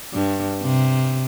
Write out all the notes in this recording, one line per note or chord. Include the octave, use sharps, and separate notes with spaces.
G2
C3